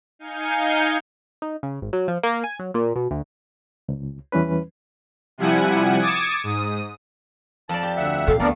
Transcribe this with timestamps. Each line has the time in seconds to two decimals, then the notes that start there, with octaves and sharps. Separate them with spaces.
0.19 D#4 F5 G#5 G6 C#7
1.42 D#4
1.63 C#3
1.81 G#1
1.93 F#3
2.08 F3
2.23 A#3
2.44 G#5
2.59 F#3
2.74 A#2
2.96 B2
3.11 D2
3.89 C#2
4.32 E2 E3 G3 C#4 B4
5.38 C3 F3 G3 E4 F#5 G#5
6.00 D6 D#6 G#6 A6 C#7 E7
6.44 G#2 D#6
7.69 F2 D5 A5
7.83 G4
7.97 D2 E5 F#5
8.27 E2 A#2 A4 F5
8.40 D2 A3 B3 D4 A#4 D5